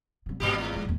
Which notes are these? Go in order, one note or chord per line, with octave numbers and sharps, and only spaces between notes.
C2 C#3
G#1 A#2 G3 G4
E2 A2
D3 G#3
A1 D#2